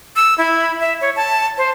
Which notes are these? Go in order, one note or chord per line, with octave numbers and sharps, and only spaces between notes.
E6
E4
E5
C#5
A5
C5